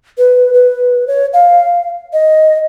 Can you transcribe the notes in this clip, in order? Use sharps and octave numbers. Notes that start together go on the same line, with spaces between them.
B4
B4
C#5
F5
D#5